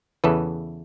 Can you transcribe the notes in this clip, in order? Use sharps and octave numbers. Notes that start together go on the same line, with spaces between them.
E2 C#3 E3 A4 B4